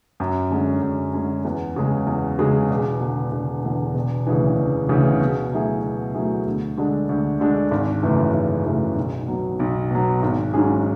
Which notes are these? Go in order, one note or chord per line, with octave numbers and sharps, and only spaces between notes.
F#2
D3 G#3 C#4
F#2
D3 G#3 C#4
E2
C#3 G#3
E2
C#3 G#3
E1
E2 D3
E1
E2 D3
E1
D2 C#3 E3
E1
D2 C#3 E3
B2
F#3 A3 E4 G#4
B2
F#3 A3 E4 G#4
D2
D3 G#3 D4
D2
D3 G#3 D4
G#1
F#2 C#3 E3 A3
G#1
F#2 C#3 E3 A3
B1
B2 F#3
B1
B2 F#3
G#1
G#2 F#3 C#4 G#4